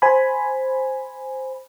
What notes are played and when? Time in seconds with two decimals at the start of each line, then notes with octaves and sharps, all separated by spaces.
0.02 C5 G#5 B5